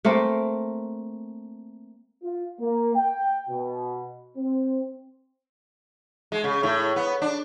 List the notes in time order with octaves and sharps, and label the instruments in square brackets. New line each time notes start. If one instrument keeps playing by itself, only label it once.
[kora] A3 A#3 C4 A#4
[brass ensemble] F4
A#3
G5
B2
C4
[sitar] G#3
C#3
A2
B3
D4